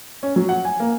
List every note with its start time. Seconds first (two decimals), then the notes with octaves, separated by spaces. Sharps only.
0.23 C#4
0.36 F#3
0.49 F#5
0.65 G#5
0.80 A#3